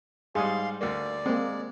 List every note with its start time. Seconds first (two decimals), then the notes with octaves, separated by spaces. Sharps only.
0.35 G#2 G3 G#4 F5 C6
0.81 D2 A#3 D5
1.26 G#3 A#3 C4